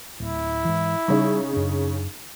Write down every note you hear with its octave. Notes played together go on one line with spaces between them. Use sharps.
D1 E4
G#2 E3
C#3 G3 D#4
F#2 D4